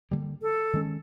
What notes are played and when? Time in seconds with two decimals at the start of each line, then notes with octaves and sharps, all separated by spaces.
0.11 D3 G3 A#3
0.42 A4
0.73 D#3 G#3 C#4